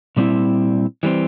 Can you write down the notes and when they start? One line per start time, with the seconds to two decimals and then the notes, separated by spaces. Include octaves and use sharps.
0.17 A#2 G3 C4 E4
1.03 E3 G3 C4